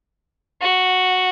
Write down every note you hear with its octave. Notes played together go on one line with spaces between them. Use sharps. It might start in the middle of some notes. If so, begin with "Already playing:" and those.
F#4